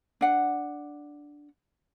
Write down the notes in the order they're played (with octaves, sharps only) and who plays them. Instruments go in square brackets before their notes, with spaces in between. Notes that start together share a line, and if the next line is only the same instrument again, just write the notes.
[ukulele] D4 F#5